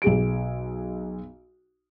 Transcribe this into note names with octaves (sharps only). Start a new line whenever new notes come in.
B1 G#4 D7